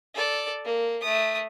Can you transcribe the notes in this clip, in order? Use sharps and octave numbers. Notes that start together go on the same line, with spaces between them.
A4 D5
A#3
A3 D#6